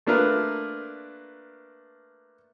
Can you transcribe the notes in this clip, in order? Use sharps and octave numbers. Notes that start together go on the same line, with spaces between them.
A3 A#3 D4 F4 A#4 B4